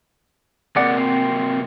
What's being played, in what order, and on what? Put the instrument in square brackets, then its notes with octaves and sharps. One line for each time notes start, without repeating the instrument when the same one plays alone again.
[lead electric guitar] C3 A#3 [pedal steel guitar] G#3 D5 F#5
[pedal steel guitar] C4